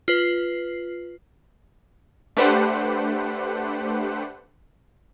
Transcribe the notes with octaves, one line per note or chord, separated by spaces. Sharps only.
F4 B4 C7
A3 D4 G4 B4 C5 F#5